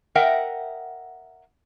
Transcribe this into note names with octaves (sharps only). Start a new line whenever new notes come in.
A#4 D#5 E5 F#5 G5